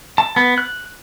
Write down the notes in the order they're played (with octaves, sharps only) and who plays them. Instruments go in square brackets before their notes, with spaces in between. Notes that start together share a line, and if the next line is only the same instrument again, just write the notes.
[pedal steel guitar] A5
B3
F#6